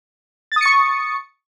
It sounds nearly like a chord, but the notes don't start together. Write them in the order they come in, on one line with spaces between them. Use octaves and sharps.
A6 D#6 C#7 C#6